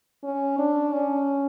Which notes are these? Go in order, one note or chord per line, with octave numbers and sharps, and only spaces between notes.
C#4
D4
C#4